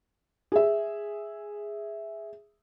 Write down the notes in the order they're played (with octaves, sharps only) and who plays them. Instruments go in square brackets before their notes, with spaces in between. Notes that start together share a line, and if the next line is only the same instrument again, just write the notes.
[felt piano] G#4 E5